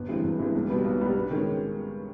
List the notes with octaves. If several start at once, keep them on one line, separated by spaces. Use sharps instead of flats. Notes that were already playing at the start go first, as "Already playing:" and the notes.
Already playing: G1
G2 E3 G#3 C4
G1
G2 E3 G#3 C4
B1
B2 G3 B3
B1
B2 G3 B3
G2
D#3 G#3 C#4